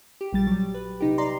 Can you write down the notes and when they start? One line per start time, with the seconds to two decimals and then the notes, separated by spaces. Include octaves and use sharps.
0.21 G4
0.33 A#1 G3 A6
0.47 F#3 G3
0.74 B4
1.01 C3 D#4 G4
1.18 D5 A#5 C6